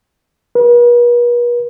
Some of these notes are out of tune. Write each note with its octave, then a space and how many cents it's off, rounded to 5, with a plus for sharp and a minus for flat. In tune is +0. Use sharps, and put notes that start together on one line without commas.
B4 -45